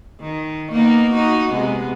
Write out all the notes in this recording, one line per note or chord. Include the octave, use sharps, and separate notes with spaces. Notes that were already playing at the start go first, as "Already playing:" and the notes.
D#3
A#3 B3 D#4
D#4 F#4
C3 G#3 B3